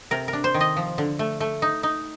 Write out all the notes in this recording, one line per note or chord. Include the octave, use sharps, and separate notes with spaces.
C3 A#4
A#4
D4
C5
D#3
D#5
F3
D3
A3
A3
D#4
D#4